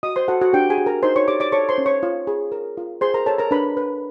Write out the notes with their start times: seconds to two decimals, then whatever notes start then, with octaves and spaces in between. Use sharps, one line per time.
0.03 F#4 D#5 D#6
0.16 C5 C6
0.28 F#4 A4 F#5
0.41 F#4 F#5
0.53 D4 G4 G5
0.70 G#4 G#5
0.78 F#4
0.86 A#4 A#5
1.03 D#4 C5 C6
1.16 C#5 C#6
1.28 G4 D5 D6
1.40 D5 D6
1.52 A4 C#5 C#6
1.69 C5 C6
1.78 C#4
1.86 C#5 C#6
2.03 F4
2.27 G#4
2.52 A#4
2.77 F4
3.01 G#4 C5 C6
3.14 A#4 A#5
3.26 A4 C#5 A5
3.38 A#4 A#5
3.51 D4 B4 B5
3.77 B4